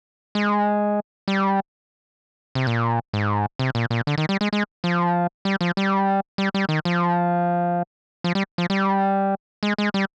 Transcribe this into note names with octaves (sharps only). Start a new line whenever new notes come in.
G#3
G3
C3
A#2
G#2
C3
A#2
A#2
D3
D#3
G3
G#3
G#3
F3
G3
F3
G3
G3
G3
D#3
F3
F3
G3
F3
G3
G#3
G#3
G3